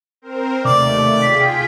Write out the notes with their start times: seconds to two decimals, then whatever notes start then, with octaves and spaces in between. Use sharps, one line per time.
0.22 C4 A#4 C5
0.65 D#2 C3 A3 D5 D6
1.22 F4 G#4 G5 B6